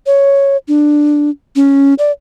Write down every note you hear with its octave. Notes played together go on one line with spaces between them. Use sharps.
C#5
D4
C#4
D5